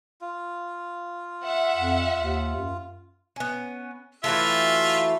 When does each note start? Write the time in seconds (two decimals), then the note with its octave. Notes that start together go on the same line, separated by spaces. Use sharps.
0.22 F4
1.44 E5 F#5
1.76 F2
2.20 D#2
2.56 F#2
3.36 B3 C#4
4.24 E3 F#3 A3 F4 E5